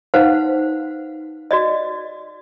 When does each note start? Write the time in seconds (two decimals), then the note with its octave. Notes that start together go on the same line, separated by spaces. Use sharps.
0.14 D#4 B4 C5 F5 F#5
1.51 F#4 D5 D#5